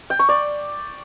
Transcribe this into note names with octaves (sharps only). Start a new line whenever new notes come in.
G5
C#6
D5